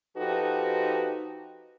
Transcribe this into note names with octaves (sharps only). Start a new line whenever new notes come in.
F3 D#4 F#4 G4 A4 B4